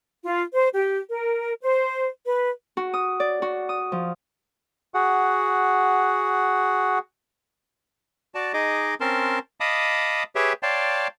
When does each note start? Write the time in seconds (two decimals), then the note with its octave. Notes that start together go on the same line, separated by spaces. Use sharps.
0.24 F4
0.53 C5
0.75 G4
1.09 A#4
1.60 C5
2.25 B4
2.77 F#4
2.94 D#6
3.20 D5
3.42 F#4
3.69 D#6
3.92 F3
4.94 F#4 G#4 F#5
8.35 F#4 D5 A5
8.53 D#4 G#4 D#5 D6
9.00 C4 C#4 A#4 A5 C6
9.60 D#5 F5 A5 B5 D6 D#6
10.35 G4 G#4 B4 C#5 E5 G5
10.63 C#5 D5 F5 G5 A5 C6